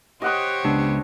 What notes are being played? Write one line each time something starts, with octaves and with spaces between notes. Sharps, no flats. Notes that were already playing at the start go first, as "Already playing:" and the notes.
G4 C5 C#5 D#5 F#5 D#6
C#2 B3 D4